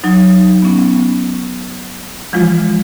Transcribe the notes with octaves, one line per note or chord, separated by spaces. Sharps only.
F#3 D#4
B3 C#4
E3 F3 G#3 F4